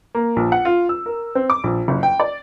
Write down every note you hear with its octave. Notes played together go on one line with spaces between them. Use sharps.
A#3
A#1
F#5
F4
E6
A#4
C4
D6
A#1
F#1
G5
D5